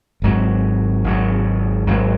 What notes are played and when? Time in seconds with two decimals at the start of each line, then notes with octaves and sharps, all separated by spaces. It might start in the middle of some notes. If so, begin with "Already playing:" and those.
0.22 G#1 G#2 F#3
1.04 G#1 G#2 F#3
1.87 G#1 G#2 F#3